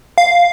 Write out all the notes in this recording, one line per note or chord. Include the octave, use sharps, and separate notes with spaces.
F5